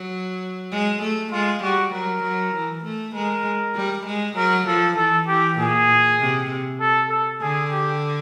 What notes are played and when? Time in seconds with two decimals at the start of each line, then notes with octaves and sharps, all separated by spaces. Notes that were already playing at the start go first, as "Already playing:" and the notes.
Already playing: F#3
0.71 G#3
1.02 A3
1.32 G#3 F4
1.63 G3 F#4
1.92 F#3 A#4
2.23 F#3
2.54 E3
2.84 A3
3.14 G#3 A#4
3.75 G3
4.06 G#3
4.36 F#3 A#4
4.66 F3 A4
4.97 E3 A4
5.28 E3 G4
5.58 A#2 G#4
6.19 C3
6.80 A4
7.10 A4
7.41 D3 G#4
7.71 G4